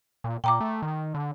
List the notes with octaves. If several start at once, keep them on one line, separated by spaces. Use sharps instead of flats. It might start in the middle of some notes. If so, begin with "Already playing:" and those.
A#2
A#2 G5 A#5 D6
A3
D#3
D3